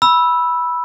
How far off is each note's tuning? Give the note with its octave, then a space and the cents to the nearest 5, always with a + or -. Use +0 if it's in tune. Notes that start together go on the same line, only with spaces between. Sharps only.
B5 -10 E6 +0